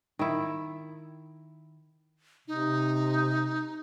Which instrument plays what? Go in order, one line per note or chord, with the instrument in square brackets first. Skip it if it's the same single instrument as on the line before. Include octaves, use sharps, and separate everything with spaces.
[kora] D#3 E4
[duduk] C3 [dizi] D#4